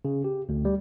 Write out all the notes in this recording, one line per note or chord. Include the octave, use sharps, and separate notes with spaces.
C#3
G4
D2
G3